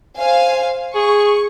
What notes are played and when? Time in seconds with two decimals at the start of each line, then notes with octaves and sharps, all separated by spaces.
0.17 C5 F5 G#5
0.95 G#4 C#6